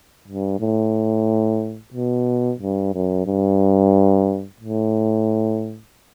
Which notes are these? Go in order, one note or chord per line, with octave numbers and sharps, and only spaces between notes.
G2
A2
B2
G2
F#2
G2
A2